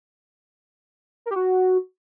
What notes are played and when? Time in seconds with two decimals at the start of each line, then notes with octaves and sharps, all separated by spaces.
1.26 A#4
1.31 G4
1.36 F#4